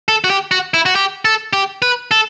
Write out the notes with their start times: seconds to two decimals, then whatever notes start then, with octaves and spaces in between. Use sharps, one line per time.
0.08 A4
0.24 F#4
0.30 G4
0.51 F#4
0.74 E4
0.86 F#4
0.95 G4
1.25 A4
1.53 G4
1.82 B4
2.11 A4